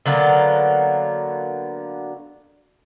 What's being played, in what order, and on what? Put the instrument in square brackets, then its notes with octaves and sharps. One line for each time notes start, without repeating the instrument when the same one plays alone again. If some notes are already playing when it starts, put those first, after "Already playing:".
[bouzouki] D3 F#3 A#3 B3